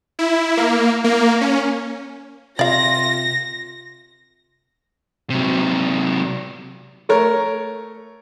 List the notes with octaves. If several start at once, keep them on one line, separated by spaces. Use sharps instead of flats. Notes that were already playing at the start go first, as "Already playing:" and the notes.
E4
A#3
A#3
C#4
C3 F4 D5 F5 A#6
C3 F#3
A3 A#4 C#5